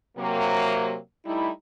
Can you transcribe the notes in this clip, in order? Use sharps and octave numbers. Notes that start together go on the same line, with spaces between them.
C3 F#3 A#3
G3 A3 D#4 E4